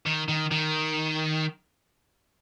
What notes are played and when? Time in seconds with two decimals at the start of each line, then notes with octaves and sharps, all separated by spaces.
0.06 D#3
0.29 D#3
0.51 D#3